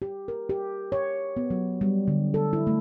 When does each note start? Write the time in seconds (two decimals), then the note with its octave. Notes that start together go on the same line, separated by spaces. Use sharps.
0.02 G4
0.28 A#4
0.49 G4
0.92 C#5
1.37 B3
1.50 F#3
1.81 G3
2.08 D3
2.34 A4
2.53 E4
2.67 A3